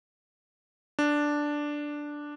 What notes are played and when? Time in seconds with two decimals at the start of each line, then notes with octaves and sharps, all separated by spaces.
0.99 D4